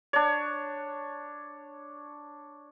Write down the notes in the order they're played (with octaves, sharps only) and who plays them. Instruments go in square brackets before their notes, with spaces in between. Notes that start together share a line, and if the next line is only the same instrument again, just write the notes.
[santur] D4 C#5